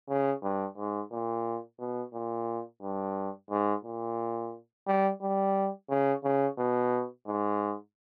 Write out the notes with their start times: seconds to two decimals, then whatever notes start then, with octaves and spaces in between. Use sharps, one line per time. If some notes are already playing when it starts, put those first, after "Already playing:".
0.09 C#3
0.42 G2
0.77 G#2
1.11 A#2
1.79 B2
2.13 A#2
2.82 G2
3.50 G#2
3.84 A#2
4.87 G3
5.21 G3
5.89 C#3
6.24 C#3
6.58 B2
7.26 G#2